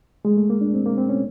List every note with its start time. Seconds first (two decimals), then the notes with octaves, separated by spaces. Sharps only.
0.25 G#3
0.37 A3
0.50 A#3
0.61 D4
0.74 C4
0.86 A#3
0.98 C4
1.09 C#4